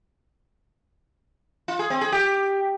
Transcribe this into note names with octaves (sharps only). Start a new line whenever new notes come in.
F4
G#4
C4
G#4
G4